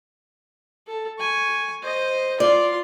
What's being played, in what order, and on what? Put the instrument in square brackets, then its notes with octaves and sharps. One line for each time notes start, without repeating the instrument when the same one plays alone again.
[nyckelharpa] A4
G#5 C#6
C5 D#5
[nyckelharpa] F4 C6 [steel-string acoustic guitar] D5